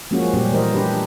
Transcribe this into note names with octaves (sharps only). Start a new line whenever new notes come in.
F3 G#3 A#3 C#4 F#4
A#2 G3 C#4 G4
E3 A3 C#4 A#4 C5 D#5
D4 G4 B4